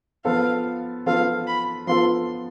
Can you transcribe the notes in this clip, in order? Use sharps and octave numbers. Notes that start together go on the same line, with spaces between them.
F3 B3 F4 A4 F5
F3 B3 F4 A4 F5
B5
F3 B3 F4 A4 C6